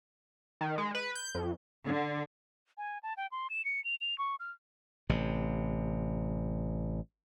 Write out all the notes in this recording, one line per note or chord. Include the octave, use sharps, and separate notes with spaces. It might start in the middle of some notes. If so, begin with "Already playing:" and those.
D#3
G#3
B4
G6
F2
D3
G#5
A5
G5
C6
E7
C#7
F7
F7
C#6
F6
A1 C3